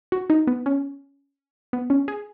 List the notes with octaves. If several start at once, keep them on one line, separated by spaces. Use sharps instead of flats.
F#4
D#4
B3
C#4
B3
C#4
G#4